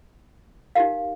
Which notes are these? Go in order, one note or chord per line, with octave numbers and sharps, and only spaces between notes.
D#4 G4 A#4 F5